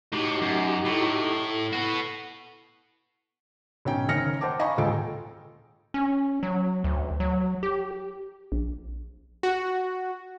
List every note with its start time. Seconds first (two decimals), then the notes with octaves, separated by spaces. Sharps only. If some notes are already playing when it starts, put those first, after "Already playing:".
0.13 A2 D#4 F#4 G4
0.42 F#2
0.86 A2 E4 A4
1.73 B3 F#4
3.85 B1 C#4 G5
4.08 F#1 D#3 C#4 F6 A#6 C#7
4.41 C5 F#5 G5 A5 D6
4.59 D#5 F5 G#5 A#5 B5 C#6
4.78 D#1 G#3 F4 A4 G5 D7
5.94 C#4
6.43 F#3
6.84 D2
7.20 F#3
7.63 G4
8.52 A#1
9.43 F#4